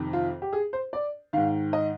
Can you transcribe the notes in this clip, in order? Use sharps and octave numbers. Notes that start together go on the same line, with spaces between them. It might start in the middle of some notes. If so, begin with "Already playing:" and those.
Already playing: F2 C3 D#3
F4
G4
G#4
C5
D5
G#2 D#3 F5
D#5